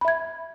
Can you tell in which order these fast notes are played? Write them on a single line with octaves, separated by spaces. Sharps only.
B5 E5 G#6